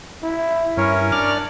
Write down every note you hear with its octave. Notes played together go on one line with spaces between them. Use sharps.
E4
G2 C#4 E4 A#4 C#5
D4 D5 F6